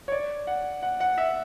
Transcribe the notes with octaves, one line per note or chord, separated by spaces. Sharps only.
C#5
D5
F#5
F#5
F#5
E5